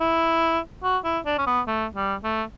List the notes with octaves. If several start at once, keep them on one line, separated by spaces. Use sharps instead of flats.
E4
F#4
E4
D4
C#4
B3
A3
G3
A3